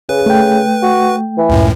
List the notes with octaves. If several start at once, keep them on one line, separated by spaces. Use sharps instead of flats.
C#3 G#4 B4
A3 G5
F#4
E3
C#2 F#2 A2